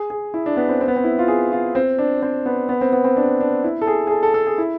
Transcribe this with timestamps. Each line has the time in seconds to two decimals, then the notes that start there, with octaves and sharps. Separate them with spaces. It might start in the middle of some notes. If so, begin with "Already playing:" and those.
Already playing: G#4
0.10 G#4
0.34 E4
0.46 D4
0.57 B3
0.69 C4
0.81 C4
0.88 B3
0.96 C4
1.04 E4
1.19 F4
1.28 G#4
1.52 F4
1.75 C4
1.98 D4
2.22 C4
2.46 B3
2.69 B3
2.81 C4
2.93 B3
3.04 C4
3.17 D4
3.40 D4
3.64 E4
3.82 A4
3.87 G#4
4.07 G#4
4.11 A4
4.23 A4
4.34 A4
4.47 G#4
4.58 E4